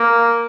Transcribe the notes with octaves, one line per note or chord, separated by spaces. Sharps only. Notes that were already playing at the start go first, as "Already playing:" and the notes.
Already playing: A#3